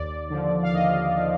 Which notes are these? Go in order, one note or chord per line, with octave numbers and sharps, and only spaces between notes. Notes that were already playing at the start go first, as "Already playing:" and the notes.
Already playing: D#2 D5
D3 F3
F5
D#2 D#5
D3 F3